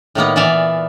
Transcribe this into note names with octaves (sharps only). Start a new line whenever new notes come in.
A2 D#3 A#3 B3
A#2 E3 B3 D5 E5 F5